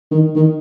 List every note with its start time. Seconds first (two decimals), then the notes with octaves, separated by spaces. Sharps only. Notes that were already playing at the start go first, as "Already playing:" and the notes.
0.11 D#3
0.35 D#3